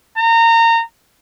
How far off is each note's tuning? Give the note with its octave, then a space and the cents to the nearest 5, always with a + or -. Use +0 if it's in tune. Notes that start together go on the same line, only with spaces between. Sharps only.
A#5 -25